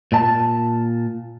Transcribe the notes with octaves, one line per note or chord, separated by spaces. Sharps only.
A#2 A5